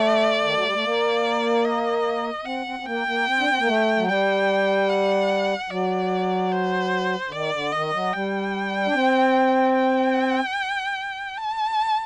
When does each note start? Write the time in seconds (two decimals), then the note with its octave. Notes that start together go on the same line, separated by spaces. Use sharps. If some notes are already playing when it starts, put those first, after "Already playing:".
Already playing: A3 D5
0.43 D#3
0.54 F#3
0.64 G3
0.74 A3
0.84 A#3
1.65 D#5
2.45 C4 F#5
2.66 C4
2.80 C4
2.86 A#3 G5
3.07 A#3
3.27 C4
3.40 D4
3.49 C4
3.59 A#3
3.67 A3
3.97 F#3
4.08 G3 G5
4.89 F#5
5.70 F#3 D5
6.52 C5
7.27 D3
7.32 D#3 D5
7.53 D3
7.72 D#3 D#5
7.93 F#3
8.13 G3 G5
8.86 D4
8.94 C4
9.75 G5
11.38 A5